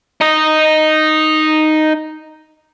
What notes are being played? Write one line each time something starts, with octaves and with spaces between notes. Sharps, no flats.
D#4 D#5